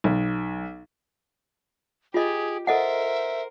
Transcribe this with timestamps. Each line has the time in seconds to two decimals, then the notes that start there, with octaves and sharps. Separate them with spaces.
0.04 B1
2.14 F4 G4 G#4 D#5
2.67 A4 A#4 C5 D#5 E5 F#5